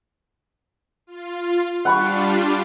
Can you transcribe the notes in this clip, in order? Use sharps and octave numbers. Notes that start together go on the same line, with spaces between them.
F4
G3 D4 F4 F#5 B5 C#6